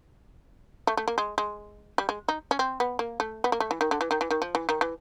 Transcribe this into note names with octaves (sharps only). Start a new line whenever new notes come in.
A3
A3
A#3
G#3
G#3
G3
G#3
D#4
C#4
C4
B3
A#3
A3
B3
A#3
A3
E3
D#3
D3
E3
D#3
E3
D#3
F3
E3
D#3
E3